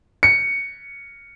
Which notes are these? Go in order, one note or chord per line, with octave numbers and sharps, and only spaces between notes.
C#7